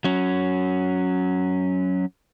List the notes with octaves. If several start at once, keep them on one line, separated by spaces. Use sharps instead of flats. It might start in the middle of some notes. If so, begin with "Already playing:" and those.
F#3 C#4